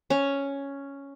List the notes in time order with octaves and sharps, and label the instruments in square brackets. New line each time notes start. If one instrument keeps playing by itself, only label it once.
[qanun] C#4